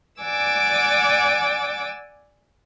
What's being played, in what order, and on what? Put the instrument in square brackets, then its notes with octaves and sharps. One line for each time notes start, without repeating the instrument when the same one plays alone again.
[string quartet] D5 F#5 G#5 D6 E6